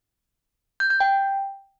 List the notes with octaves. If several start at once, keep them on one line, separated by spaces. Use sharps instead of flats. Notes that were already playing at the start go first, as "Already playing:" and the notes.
G6
G6
G5